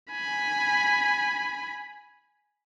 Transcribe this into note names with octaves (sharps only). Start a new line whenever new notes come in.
G#5 B5